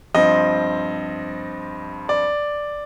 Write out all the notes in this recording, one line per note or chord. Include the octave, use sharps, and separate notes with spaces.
G2 F3 C4 D#5
D5